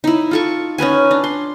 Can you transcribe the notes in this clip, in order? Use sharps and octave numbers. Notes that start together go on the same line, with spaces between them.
D#4 E4
F4 A4 C#6
C#4 D#4 B4 G#5
D4
C6